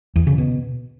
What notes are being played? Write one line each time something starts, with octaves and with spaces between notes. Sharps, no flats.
E2
C#3
B2